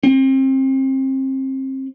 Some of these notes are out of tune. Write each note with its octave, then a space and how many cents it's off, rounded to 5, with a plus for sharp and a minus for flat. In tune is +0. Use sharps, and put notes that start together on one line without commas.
C4 +30